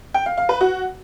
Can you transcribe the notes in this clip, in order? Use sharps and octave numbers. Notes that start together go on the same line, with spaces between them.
G5
F5
F5
B4
F#4